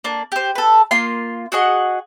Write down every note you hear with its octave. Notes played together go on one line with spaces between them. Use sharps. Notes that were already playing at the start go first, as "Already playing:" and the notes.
A#3 D4
G4 C5
A4 B4
A#3 F4 C6
F#4 G#4 D#5 F#5